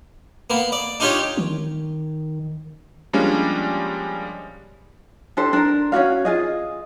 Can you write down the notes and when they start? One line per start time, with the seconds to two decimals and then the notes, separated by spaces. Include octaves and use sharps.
0.50 A#3 B3
0.72 D5
1.00 D4 D#4 F4 G4 C#5
1.37 D#3
3.13 F3 G3 G#3 A#3 C#4 D4
5.37 D4 G4 A4 C5
5.53 D4 A#4
5.92 C#4 D#4 F#4 F5
6.25 F4 G#4 D#5